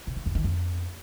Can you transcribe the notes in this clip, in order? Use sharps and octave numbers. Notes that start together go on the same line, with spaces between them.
C3
D3
F2
D#3
F2